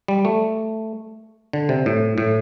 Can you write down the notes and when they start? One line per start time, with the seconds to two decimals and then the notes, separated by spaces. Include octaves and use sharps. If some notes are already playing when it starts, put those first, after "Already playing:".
0.08 G3
0.25 A3
1.53 D3
1.69 C3
1.86 A2
2.18 A2